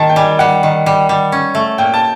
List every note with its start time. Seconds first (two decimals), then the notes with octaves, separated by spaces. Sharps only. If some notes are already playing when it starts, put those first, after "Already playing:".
Already playing: D#3 A5
0.09 G5
0.16 G3 G#5
0.39 G3 F#5
0.63 D#3
0.86 G3
1.09 G3
1.32 C#4
1.55 A3
1.78 A#2 G5
1.94 A5